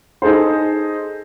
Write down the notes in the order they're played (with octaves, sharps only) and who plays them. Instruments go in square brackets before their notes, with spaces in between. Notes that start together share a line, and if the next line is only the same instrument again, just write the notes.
[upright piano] D#4 G#4 A4 C5